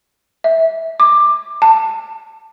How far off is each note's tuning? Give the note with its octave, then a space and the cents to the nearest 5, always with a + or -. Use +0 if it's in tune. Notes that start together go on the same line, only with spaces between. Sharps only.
E5 -20
D6 +15
A5 +20